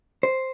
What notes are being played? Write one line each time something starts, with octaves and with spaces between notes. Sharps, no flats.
C5